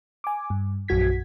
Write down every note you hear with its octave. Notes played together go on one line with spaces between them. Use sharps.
G#5 D6
G2
A#1 F#2 F#4 G#6 B6